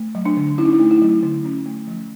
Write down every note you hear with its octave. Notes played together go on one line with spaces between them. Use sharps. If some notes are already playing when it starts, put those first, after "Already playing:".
Already playing: A3
F#3
D4
D3
C#4 E4
D#4
E4
A3
E4
F#3
D3
C#4
A3
F3